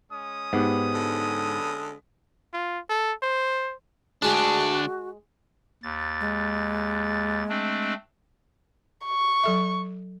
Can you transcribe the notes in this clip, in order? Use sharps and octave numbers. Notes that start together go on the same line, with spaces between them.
G#3 C#4 D#6
G#2 B3 G4
D3
F4
A4
C5
D2 G#3 D4 F#4 G#4
D#2 A6
G#3
A3 C4 D4
C#6
F#3 A4 E5